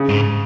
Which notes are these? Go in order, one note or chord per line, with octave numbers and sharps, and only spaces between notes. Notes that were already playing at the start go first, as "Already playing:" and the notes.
Already playing: C#3
G#2